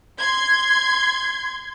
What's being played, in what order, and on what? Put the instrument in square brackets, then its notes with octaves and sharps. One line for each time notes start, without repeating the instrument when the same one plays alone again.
[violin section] C6 G#6